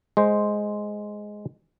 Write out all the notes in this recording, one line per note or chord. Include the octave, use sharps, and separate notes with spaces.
G#3 C5